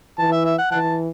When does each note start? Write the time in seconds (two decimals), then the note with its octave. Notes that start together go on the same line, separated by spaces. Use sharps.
0.18 E3 A5
0.32 E5
0.45 E5
0.58 F#5
0.72 E3 F#5 A5